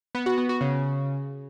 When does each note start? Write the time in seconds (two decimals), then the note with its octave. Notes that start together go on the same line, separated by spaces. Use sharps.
0.15 B3
0.26 F#4
0.38 B3
0.49 F#4
0.61 C#3